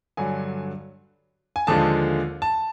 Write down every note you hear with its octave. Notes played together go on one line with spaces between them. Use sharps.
G2 D3 F#3 G#5
G#5
D#2 D3 F3 G#3 A5
A5